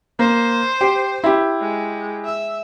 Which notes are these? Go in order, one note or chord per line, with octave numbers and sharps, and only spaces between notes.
A#3 C5
G4
E4 G4
G#3
E5